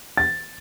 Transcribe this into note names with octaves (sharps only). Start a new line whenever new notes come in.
A6